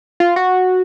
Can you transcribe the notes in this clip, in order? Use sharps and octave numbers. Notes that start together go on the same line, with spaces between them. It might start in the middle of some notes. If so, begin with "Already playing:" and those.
F4
F#4